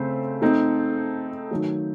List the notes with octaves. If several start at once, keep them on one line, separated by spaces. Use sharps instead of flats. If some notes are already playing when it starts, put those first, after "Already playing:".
Already playing: C#3 A3 C4 C5
A3 C4 D#4 A4
D#3 F#3 A3